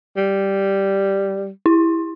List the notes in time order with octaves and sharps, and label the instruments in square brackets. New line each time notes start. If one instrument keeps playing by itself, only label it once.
[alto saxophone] G3
[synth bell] E4